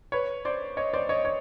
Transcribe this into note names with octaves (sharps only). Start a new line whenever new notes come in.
B4 C#5
C5 D5
C#5 D#5
C5 D5
C#5 D#5
C#5